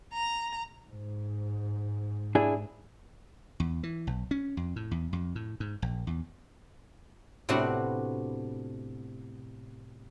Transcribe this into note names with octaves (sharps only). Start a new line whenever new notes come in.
A#5
G#2
D4 E4 G#4
E2
E3
B1
C#4
F2
A2
E2
F2
A2
G#2
A#1
E2
A2 C3 B3 D4 F#4